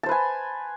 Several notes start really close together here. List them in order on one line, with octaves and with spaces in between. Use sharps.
A5 C5 B4 G#5